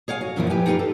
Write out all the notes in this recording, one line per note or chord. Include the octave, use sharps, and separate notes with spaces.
G#4 C#5 F5 G5 G#5
F#4
F#2 A#2 E3 F3 A#3 E4
G4 B4 G5 G#5
D#4 F4 G4 A#4 B4 F5
A4